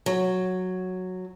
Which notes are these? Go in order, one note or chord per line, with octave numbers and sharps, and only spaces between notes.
F#3